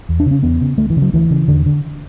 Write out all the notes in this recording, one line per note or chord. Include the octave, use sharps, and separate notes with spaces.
E2
D4
C#3
C#4
E2 B3
C#3
D2 A3
E3
C#3
F#3
D2 E3
C#3
E2 D3
D3